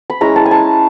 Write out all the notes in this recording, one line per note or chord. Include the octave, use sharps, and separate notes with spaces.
B5
G#3 C#4 E4 A#5
A5
G#5
A5